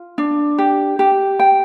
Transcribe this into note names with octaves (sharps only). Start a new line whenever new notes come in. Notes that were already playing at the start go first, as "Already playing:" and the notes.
Already playing: F4
D4
G4
G4
G5